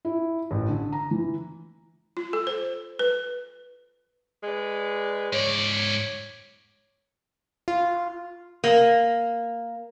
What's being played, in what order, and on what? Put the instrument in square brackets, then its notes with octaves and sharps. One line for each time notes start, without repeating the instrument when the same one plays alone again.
[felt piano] E4
A1
D3
A#5
E3
[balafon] F4
A4
C5
B4
[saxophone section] G#3 B4 D5
[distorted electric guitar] G#2 D5 [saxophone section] C#5
[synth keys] F4
[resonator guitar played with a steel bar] A#3